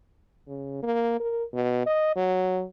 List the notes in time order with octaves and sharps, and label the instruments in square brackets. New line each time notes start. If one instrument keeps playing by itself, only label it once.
[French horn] C#3
A#3
A#4
B2
D#5
F#3